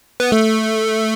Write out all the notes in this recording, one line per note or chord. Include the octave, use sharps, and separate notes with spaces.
B3
A3